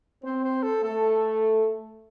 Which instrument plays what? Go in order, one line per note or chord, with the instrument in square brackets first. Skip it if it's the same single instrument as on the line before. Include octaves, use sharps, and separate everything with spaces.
[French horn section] C4 [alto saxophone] C5
[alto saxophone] C5
A4
[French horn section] A3 [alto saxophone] A4